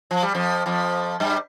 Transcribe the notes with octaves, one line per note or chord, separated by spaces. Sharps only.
F3
G3
F2 F3
F2 F3
G2 G3